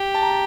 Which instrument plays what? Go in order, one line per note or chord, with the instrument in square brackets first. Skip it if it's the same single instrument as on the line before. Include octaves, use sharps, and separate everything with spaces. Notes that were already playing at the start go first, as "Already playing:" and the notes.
Already playing: [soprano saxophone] G4
[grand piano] A5
A#5
A5